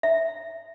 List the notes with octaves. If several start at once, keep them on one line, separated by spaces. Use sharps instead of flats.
E5